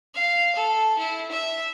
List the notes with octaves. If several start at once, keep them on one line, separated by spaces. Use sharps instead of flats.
F5
A4
E4
E5